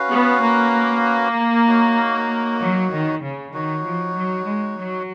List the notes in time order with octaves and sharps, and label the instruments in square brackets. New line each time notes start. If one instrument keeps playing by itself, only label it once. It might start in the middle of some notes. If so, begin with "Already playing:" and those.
Already playing: [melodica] C#4 F#4 B4 F5
[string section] B3
A#3
[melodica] D#4 F#4 C#5
[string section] F#3
D#3
C#3
[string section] D#3 [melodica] D#4 F#4 C#5
[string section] F3
F#3
G#3
F#3